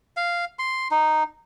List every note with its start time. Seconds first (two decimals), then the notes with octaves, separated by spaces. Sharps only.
0.17 F5
0.59 C6
0.91 D#4